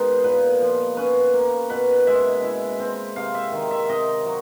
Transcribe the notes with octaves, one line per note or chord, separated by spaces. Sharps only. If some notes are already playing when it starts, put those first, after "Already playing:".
Already playing: D#3 G#3 B3 D#4 C5
A#2 B4
F3
C#4 B4
A#3
B2 B4
G#3 E5
E4
C4
C3 F5
E5
D#3
E5
C3 D#5
F#3